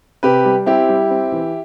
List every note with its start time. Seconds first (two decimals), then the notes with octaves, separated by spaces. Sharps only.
0.23 C3 G4 B4
0.45 G3
0.66 C4 E4 G4
0.89 G3
1.10 C4
1.32 E3